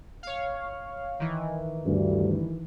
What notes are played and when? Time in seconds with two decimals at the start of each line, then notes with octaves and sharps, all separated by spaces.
0.23 C#5 F5
1.20 D#3 E3
1.85 D2 G2